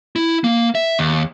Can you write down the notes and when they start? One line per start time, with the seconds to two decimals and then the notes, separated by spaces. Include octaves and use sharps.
0.16 E4
0.44 A#3
0.75 E5
0.99 D#2